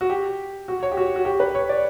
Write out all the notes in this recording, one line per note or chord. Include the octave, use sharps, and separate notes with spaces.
F#4
G4
F#4
C#5
G4
F#4
F#4
G4
B4
C#5
D5